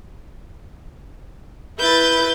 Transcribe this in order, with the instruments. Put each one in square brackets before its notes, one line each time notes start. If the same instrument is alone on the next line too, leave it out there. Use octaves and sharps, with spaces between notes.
[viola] E4 B4 [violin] G6 A6